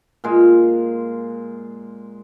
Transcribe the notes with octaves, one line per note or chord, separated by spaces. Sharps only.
A#2 G#3